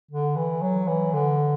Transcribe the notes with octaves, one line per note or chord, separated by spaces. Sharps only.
D3
E3
F#3
E3
D3